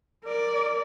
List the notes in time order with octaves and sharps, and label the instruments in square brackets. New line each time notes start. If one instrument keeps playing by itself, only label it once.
[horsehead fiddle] A#4 D5